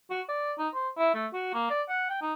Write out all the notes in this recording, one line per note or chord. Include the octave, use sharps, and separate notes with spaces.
F#4
D5
D#4
C5
E4
A3
F#4
A#3
D5
F#5
G5
D#4